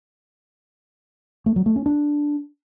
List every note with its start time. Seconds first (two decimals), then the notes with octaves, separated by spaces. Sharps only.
1.46 A3
1.56 F#3
1.66 A3
1.76 C#4
1.86 D4